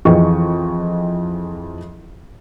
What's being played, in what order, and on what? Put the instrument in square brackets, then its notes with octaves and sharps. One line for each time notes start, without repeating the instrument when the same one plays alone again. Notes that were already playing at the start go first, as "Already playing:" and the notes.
[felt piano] F2 E3 G#4 D#5 G5 C#6